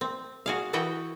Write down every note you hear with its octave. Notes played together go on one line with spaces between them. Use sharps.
C4
F#4 G#4 F5
E3 E4 F#4 D#5 G5